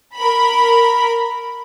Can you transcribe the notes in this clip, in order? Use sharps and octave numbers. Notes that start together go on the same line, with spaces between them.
A#4 B5